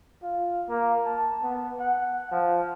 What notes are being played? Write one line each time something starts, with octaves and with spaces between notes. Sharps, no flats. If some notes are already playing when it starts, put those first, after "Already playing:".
F4
A#3
A5
B3
F#5
F3